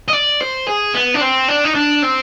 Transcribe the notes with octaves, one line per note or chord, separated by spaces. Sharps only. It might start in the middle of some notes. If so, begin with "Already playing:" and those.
D#5
D5
C5
G#4
B3
D4
C4
D4
D#4
D4
C4